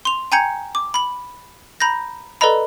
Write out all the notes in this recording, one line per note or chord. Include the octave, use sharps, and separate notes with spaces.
C6 F7
G5 G#5 A#5 G6 G#6 C#7
D6
B5 F#7
A#5 B5 G6 A#6
A4 B4 D5 D#5 A#5 B5